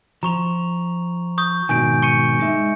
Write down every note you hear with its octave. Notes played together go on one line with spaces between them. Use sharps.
F3 A#5 C#6 F7
C#6 D#6 G6
G#2 B2 D#3 G#5 G6 D7
C#6 C#7 D#7
G#3 D#4 E5